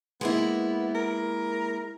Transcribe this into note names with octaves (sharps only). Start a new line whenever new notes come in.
G#3 A#3 B3 E4
A#4